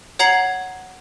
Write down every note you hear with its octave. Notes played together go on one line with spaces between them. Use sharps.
C#5 F#5 A#5 G#6 C7 F#7